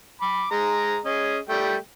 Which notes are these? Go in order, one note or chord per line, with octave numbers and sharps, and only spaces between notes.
B5 D6
G#3 A#5
C#4 G#4 D#5
G3 A3 G5